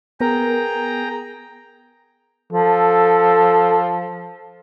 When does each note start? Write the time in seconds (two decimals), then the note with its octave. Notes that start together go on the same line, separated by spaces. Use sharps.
0.21 B3 G#4 A#4 G5 A#5
2.53 F3 A4